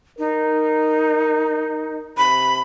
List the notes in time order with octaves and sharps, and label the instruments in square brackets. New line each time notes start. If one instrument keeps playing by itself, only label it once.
[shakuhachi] D#4 [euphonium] A#4
[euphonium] C3 [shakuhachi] B5